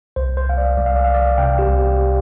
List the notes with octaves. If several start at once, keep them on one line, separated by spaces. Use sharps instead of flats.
C2 C5
C5
C2 F5
D5
C2 D5
F5
D5
C2 F5
D5
C3 G5
G4
C2
G4
G4